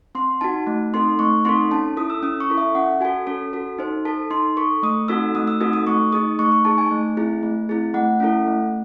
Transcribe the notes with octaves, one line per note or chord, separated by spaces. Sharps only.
C4 C6
D#4 F#4 A5
A3
C4 D#4 A4 C6
A3 C#6
C4 D#4 A4 C6
C#4 A5
E4 A4 D#6
E6
C#4 D#6
C#6
E4 A4
E5
C#4 F#5
F#4 A4 G#5
C#4 A4
F#4 A4
D#4 C5
A4 A5
D#4 C6
A4 C#6
A3 D#6
C4 D#4 F#4 A4 E6
A3 D#6
E6
C4 D#4 F#4 A4 D#6
D#6
A3 C#6
D#4 G#4 D#6
A3 C#6
C#6
D#4 G#4 A5
G#5
A3
C4 E4 G#4
A3
C4 E4 G#4
A3 F#5
C#4 E4 A4
A3